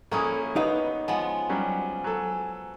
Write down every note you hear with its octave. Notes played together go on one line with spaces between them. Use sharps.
A#1 A#3 C#4 E4 A4 C#6 D#6
B3 D#4 B4 D#5 F5
F3 G#3 B3 G#5
F#3 G3 C#4
F#3 A4